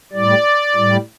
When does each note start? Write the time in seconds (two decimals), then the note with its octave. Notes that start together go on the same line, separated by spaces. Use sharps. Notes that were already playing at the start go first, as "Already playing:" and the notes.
0.12 A2 G3 D5
0.75 A2 G3